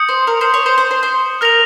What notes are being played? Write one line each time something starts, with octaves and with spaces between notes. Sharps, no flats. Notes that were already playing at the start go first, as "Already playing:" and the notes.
Already playing: D#6 G6 C#7
C5
A#4
C5
C#5
C5
C5
C5
C5
A#4 F6 A#6 F7